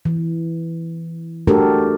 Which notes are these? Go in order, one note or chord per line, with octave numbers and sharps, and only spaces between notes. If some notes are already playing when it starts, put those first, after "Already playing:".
E3
A3 D4 F#4 G4 A4 A#4